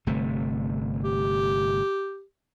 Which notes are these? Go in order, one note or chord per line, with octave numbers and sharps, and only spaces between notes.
G1 C3 A3
G4